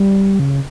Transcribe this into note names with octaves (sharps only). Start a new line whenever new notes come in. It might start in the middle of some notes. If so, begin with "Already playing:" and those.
Already playing: G3
C#3